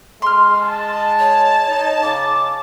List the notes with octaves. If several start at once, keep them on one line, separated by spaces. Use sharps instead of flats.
G#3 C6 F6
A5
C#5
D#4
C#3 D6